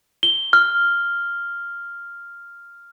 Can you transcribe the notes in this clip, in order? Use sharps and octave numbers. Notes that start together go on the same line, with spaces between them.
G7
F6